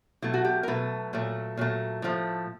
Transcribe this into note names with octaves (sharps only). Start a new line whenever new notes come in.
B2 F#3 A3 E4
F#4
G4
A#4
B2 F#3 A3 B4
A#2 F#3 A3
A#2 F#3 A3
A2 F3 A3